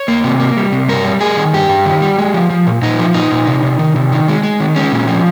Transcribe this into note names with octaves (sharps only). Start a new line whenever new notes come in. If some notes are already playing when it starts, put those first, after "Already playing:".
Already playing: C#5
A#3
C3
A#3
G3
C3
G2 A#4
G3
G3 G#4
D#3
G2 G4
G2
D#3
G3
G#3
F3
F3
A#2
A#2 D#4
F3
A#2 D#4
A#2
C3
C3
D#3
C3
D#3
G#3
G#3
D#3
G#3 C#4
A#2
F3